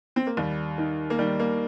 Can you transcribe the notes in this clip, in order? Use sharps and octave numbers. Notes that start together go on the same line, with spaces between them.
C4
A#3
D#2 G3
D#3
A#3
D#3 G3
A#3